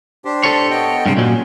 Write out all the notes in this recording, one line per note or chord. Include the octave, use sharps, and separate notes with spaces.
D4 G4 C5
A4 C#5
B3 D#5 G5
G2 C3 G#3 G5
A#2 F#3 C#4